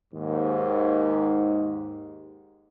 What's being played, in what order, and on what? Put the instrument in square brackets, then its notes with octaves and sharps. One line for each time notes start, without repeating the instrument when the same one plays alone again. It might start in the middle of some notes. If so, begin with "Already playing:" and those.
[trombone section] D#2 G#2